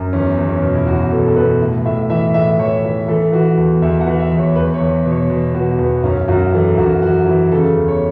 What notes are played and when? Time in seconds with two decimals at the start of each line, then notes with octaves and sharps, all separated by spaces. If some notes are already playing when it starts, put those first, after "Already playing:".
Already playing: F#2
0.13 E2 C#4
0.37 E2
0.49 C#4
0.62 B2
0.75 E4
0.86 E2 F#4
1.11 B2 A4
1.27 A4
1.36 B2 B4
1.61 A2
1.85 A2 E5
2.09 E3 E5
2.34 A2 E5
2.59 E3 C#5
2.84 E3
3.08 E3 A4
3.32 E3 F#4
3.57 E2
3.82 E2 E5
4.01 F#5
4.06 E3
4.19 E5
4.31 E2
4.38 C#5
4.56 E2 B4
4.74 C#5
4.80 E2
5.06 B2
5.11 C#5
5.30 B2
5.54 B2 F#4
5.79 E2 B3
6.04 F#2 C#4
6.28 F#2 F#4
6.52 E3 A4
6.78 F#2 F#4
7.02 E3 F#4
7.26 E3 E4
7.51 C#3 A4
7.76 E2
7.88 C#5